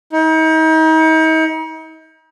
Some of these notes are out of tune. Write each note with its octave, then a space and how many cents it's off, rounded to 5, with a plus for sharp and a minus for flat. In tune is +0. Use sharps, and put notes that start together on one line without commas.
D#4 +40